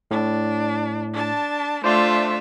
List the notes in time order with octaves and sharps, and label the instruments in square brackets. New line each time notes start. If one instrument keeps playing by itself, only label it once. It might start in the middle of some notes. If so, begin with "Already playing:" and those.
[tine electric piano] A2 [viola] D4
[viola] D4 A5
[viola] A3 D4 [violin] F4 E5 [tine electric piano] C5 D5 C6